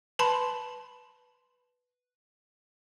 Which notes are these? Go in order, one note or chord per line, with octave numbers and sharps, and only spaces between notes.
B4 A5 B5 C6